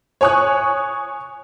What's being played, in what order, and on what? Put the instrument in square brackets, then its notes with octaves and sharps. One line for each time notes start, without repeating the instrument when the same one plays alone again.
[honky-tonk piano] C#5 G#5 C#6 D#6 F#6